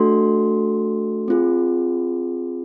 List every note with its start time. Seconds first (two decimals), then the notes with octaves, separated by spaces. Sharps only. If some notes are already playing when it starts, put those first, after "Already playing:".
Already playing: A3 D4 F#4 A4 C6
1.28 C4 F4 G#4